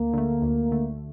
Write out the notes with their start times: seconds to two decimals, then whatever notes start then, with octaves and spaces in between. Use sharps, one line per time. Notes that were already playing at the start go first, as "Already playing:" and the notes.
Already playing: D2 A#3
0.13 D3 A3
0.42 D2
0.72 D3 A3